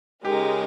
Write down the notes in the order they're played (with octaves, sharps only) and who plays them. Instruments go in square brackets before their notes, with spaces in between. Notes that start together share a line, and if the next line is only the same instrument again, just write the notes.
[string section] C#3 G#3 D#4 A#4 [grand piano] G4